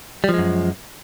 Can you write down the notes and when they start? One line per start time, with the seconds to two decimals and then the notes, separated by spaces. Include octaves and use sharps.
0.24 G3
0.29 F3
0.34 G#3
0.39 F#2